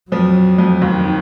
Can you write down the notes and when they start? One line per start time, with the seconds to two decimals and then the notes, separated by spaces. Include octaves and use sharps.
0.12 F2 F3 F#3
0.58 F2 F3
0.82 D#2 D#3
1.05 D#3